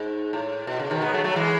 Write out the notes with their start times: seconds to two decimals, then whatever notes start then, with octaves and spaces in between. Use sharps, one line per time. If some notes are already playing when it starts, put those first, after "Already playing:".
Already playing: G#2
0.33 A2
0.67 B2
0.79 C#3
0.90 B2 D#3
1.02 G#3 B3
1.13 F#3 A3
1.24 F#3 A3
1.36 E3 G#3